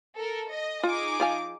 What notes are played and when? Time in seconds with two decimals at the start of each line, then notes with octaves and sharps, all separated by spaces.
0.15 A4 A#4
0.48 D#5
0.83 D#4 F4 G#4 D6
1.20 F3 F5 G#5